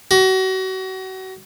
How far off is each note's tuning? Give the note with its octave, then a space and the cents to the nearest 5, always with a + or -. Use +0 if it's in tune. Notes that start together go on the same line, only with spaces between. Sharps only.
F#4 +35